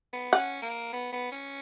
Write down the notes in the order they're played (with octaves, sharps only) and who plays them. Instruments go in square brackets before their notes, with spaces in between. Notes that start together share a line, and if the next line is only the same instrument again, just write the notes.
[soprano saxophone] B3
[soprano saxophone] C#4 [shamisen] F#5
[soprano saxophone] A#3
B3
B3
C#4